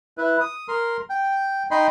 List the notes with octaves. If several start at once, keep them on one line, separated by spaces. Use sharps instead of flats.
E4 B4
D#6
A#4 C6
G5
D#4 D#5 G5 B5 C6